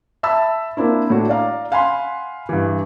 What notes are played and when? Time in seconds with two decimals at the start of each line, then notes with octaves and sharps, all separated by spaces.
0.23 E5 A5 B5 E6
0.77 A#3 C4 D4 E4
1.10 A2 D4 F#4
1.29 D5 F5 A#5
1.72 F5 F#5 G#5 B5 C6
2.49 G2 E3